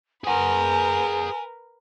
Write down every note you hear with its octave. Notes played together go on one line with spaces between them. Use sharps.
G#4 A#4 B4 F#5 G#5